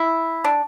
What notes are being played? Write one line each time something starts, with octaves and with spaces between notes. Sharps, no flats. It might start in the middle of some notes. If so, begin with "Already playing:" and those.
Already playing: E4
D4